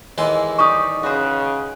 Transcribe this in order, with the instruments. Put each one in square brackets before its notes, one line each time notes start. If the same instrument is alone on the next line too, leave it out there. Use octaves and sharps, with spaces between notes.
[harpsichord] D#2 E3 C6 [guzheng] G#3
[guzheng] G3 D#4 G4 [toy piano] C#6 D#6
[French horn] C#3 [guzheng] F#4 B4 C5